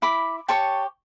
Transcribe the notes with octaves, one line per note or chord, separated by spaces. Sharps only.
E4 B5 D6
G4 C#5 A5 C#6